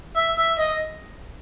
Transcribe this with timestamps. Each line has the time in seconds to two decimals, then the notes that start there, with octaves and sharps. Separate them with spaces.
0.16 E5
0.37 E5
0.59 D#5